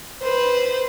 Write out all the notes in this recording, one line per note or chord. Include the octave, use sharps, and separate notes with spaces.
B4 C5